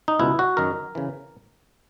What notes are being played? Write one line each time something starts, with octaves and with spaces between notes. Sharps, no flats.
D#4
C#2 B2 E4
F#4
F#2 D#3 A#4
C#3 E3